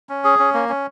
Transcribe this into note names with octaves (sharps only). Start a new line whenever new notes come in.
C#4
G#4
C#4
A#3
C#4